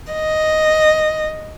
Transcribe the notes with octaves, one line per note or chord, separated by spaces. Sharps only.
D#5